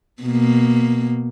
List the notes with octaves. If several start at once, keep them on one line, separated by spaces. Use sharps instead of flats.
B2 A#3